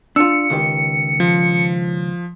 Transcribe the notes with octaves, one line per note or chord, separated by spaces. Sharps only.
D4 F4 E6 C#7
C#2 D#3 G4
F3